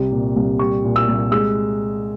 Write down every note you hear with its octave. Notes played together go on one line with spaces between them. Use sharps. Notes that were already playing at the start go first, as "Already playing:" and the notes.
Already playing: C2 C3 G3
A#2
C2
G3 C#6
A#2
E6
C2
G#3 E6